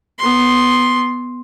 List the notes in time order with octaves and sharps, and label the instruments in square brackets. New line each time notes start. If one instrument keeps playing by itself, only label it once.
[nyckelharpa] B3 C6